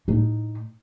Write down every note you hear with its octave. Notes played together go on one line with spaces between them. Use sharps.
A2 D#4